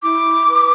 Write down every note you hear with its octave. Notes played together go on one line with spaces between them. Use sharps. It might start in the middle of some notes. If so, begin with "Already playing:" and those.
E4 D6
B4